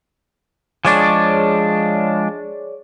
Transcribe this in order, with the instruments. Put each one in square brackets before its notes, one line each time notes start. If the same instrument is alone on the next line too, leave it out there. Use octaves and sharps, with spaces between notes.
[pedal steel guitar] F3 G#3 D4 [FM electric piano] G#4 C#5 D5